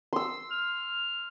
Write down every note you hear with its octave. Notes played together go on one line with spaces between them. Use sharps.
C6 E6
F6